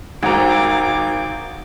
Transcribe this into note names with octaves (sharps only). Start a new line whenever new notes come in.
G#1 D#4 F#4 A#4 C5 F#5 A#5 D6